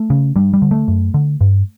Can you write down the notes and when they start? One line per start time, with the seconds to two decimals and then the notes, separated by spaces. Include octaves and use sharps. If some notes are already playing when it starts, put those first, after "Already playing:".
Already playing: A3
0.10 C#3
0.36 G2 G3
0.54 G3
0.62 D3
0.71 A3
0.88 F#2
1.14 D3
1.41 G2